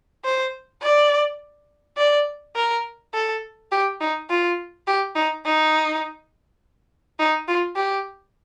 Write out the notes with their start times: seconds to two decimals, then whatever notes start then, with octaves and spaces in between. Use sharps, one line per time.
0.24 C5
0.82 D5
1.97 D5
2.56 A#4
3.14 A4
3.72 G4
4.01 D#4
4.30 F4
4.87 G4
5.15 D#4
5.45 D#4
7.19 D#4
7.48 F4
7.76 G4